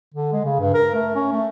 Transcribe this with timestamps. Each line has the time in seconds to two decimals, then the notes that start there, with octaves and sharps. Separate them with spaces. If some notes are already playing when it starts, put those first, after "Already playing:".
0.14 D3
0.33 G#3
0.44 C#3
0.60 G2
0.74 A#4
0.95 A3
1.15 C#4
1.32 A3